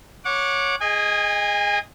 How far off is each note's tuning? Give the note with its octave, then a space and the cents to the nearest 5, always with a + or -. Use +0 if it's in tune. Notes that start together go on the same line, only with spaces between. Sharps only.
C#5 +0 F#5 -25 D6 +0
G#4 +0 D#5 +0 G#5 -35